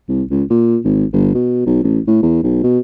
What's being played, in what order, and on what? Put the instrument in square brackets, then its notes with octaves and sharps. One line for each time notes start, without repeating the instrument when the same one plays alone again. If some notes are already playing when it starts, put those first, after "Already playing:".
[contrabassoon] C2
C#2
A#2
G#1
G1
B2
B1
A1
A2
E2
B1
B2